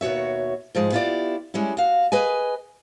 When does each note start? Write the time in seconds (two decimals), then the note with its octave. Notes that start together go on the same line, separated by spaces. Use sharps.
0.01 D#2 B2 F#4 C#5 E5
0.75 G#2 F3 G#3
0.92 B3 E4 F4 G4 D5
1.54 G3 G#3 C#4 E4
1.77 F#4 F5
2.12 G#4 B4 D#5 G#5